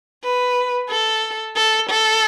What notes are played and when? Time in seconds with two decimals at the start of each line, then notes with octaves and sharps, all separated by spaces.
0.23 B4
0.90 A4
1.56 A4
1.89 A4